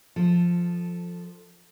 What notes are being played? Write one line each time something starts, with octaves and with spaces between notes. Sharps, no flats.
F3 A4